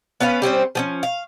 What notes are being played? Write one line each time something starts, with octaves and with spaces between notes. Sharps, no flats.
B3 C#4 B4 F5
G3 C4 C#4 C5
F3 B3 C#4
F5